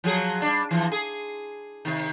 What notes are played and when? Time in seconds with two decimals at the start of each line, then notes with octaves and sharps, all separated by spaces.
0.04 F3 F#3 G#4
0.42 G3 D4
0.71 E3 F3
0.92 G#4
1.85 C3 D#3